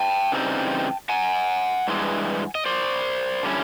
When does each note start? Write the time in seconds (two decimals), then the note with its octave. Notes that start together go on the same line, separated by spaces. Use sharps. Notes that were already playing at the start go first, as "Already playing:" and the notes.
Already playing: G5 A5
0.32 C#3 E3 G3 C4 D#4
1.09 F#5 G#5
1.88 G2 E3 G#3
2.55 D#5
2.66 C5 D5
3.43 D3 G3 A#3 C#4 E4